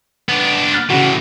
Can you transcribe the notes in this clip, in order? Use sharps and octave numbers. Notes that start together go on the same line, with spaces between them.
B3 D4
F6 F#6 A6
A2 C#3 E3 F#4